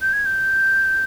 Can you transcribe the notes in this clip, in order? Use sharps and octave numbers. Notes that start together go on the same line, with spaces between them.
G6
G#6
G6